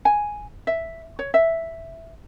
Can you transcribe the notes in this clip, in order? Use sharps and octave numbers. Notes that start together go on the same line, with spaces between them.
G#5
E5
C#5
E5